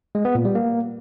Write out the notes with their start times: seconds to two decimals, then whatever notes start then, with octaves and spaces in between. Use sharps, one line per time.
0.15 G#3
0.25 B3
0.35 A#2
0.45 G3
0.55 A#3